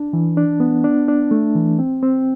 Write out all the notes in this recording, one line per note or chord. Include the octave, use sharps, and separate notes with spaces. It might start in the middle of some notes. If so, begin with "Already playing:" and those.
Already playing: D4
E3
D4
B3
D4
D4
A3
E3
C4
C4